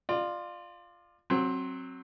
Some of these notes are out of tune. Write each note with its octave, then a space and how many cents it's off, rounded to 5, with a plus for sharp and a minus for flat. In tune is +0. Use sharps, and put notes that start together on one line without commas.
F4 +0 D5 +35
F#3 +0 C4 +15